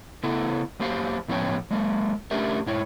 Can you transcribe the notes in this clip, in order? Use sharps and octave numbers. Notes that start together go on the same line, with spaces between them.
C#3 B3 E4 A4
F#2 A#3 G4 C5 F5
A2 F3 B3 C#4 C#5 G5
F#3 G#3 A#3 A#4
A3 C#4 D4 G4 A#4 E5
G#2 E4 C#5